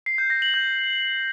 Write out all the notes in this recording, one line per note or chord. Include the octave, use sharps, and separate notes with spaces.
C7
G6
A#6
F#7
G6